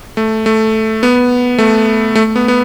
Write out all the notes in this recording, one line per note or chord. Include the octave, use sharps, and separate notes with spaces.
A3
A3
B3
A3
A3
B3
B3